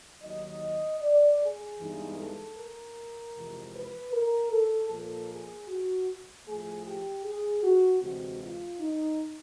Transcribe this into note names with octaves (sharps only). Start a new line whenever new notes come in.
D#2 D#3 F#3 D#5
D5
G#4
G2 E3 G#3 B3 D#4
A4
A#4
F2 C3 E3 G#3
B4
A#4
A4
A#2 F3 A#3 A4
G#4
F#4
A2 F3 A3 G#4
G4
G#4
F#4
D2 C3 E3 G#3 C4 F#4
F4
D#4